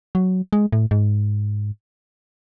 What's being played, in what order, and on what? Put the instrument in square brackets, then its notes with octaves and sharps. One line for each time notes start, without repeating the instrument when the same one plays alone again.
[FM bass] F#3
G#3
A2
G#2